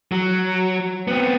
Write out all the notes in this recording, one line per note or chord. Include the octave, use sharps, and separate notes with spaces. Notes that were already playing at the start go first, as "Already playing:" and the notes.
F#3
B3 C4